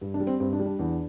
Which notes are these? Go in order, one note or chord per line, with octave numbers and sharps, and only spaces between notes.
G2
D4
G3
C4
G2 C4
D4
G3
D4
E2 D4